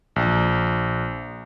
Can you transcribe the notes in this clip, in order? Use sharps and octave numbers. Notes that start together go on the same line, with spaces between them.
A#1